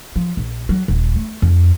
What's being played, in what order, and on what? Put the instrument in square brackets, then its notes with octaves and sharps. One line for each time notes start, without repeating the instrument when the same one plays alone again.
[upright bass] F3
A#1
F#3
D#1
A3
F2